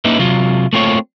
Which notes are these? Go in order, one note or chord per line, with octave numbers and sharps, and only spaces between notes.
A#3 C#4 D#4 E4 B4
C3 F#3 F4
A3 A#3 C4 F4 C#5